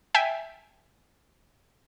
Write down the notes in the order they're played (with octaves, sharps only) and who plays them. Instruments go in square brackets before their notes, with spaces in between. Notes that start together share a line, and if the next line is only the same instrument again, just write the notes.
[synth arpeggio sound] E5 G5 G#5